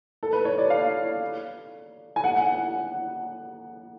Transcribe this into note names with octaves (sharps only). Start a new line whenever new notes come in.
A4
B4
C#5
D5
F5
G#5
F#5
F#5